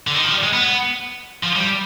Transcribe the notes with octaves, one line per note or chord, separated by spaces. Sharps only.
D3
D#3
F3
G3
G#3
B3
F3
G3